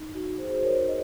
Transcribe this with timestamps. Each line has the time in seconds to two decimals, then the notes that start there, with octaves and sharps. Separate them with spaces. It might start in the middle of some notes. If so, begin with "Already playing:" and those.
Already playing: D#4
0.14 D#4 F#4
0.39 G#4 C5
0.63 A#4 C#5
0.87 C5 D#5